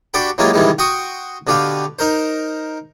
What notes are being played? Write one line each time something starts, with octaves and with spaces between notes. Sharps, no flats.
D4 F#4 G4 A4 G5 B5
E3 F#3 G#3 A#3 F4 G4
G2 C3 D#3 E3 G3 G#3
F#4 G5 C6 C#6 D#6
B2 D3 G4 B4 F5
D#4 A#4 C5